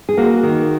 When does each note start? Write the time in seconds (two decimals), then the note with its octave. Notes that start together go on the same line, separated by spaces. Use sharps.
0.09 G#4
0.17 A#3 F#4
0.43 D#3